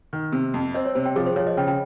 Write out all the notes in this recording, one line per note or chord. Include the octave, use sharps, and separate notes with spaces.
D#3
C3
F2
C4 D#5
C#5
C3 C5
G5
F3 G#4
C5
F3 C#5
D#5
C#3 G5
G5